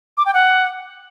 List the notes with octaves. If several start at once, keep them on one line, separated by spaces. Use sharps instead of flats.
D6
G5
F#5